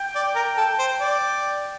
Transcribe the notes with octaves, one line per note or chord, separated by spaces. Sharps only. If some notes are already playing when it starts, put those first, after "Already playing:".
Already playing: G5
D5
A#4
A4
C5
D5